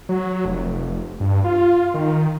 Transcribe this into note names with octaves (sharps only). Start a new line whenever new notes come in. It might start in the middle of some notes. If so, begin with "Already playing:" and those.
F#3
F1
G2
F4
D#3